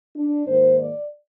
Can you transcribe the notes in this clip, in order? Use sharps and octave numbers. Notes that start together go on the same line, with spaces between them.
D4
G#2 D#3 A#3 C5
D5